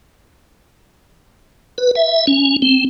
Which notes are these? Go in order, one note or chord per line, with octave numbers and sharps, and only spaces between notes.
B4
E5
C#4
C4